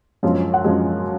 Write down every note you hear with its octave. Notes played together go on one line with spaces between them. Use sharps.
F#2 F3 G#3
C#5
F#5
F#2 F3 G#3